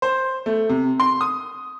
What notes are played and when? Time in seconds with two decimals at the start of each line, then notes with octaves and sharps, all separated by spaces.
0.02 C5
0.46 A3
0.69 C3
1.00 C6
1.21 D#6